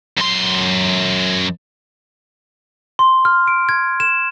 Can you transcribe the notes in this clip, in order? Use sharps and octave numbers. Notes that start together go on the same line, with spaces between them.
F#2 C6
C6
F6
D7
G#6
E7